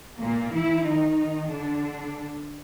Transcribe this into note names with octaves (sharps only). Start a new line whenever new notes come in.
A#2 A#3
E3 E4
D#3 D#4
D3 D4